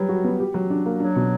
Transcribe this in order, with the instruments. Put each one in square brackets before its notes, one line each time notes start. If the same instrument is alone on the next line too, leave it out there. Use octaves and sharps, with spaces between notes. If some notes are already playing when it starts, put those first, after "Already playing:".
Already playing: [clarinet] F#3 [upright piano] G3 B4
[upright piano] F#4
B3
G4
F#3
D4
A#3
[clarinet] F#3 [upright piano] D4
[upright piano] B2